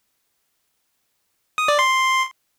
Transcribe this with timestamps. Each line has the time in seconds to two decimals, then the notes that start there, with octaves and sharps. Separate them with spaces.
1.58 D#6
1.68 D5
1.79 C6